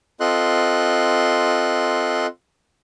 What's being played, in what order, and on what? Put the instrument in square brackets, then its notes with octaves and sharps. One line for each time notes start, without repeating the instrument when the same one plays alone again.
[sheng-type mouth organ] C4 F4 A4 D#5 C6 F#6